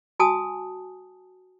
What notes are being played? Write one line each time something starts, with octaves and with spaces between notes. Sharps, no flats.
F#4 G#5 A5 D#6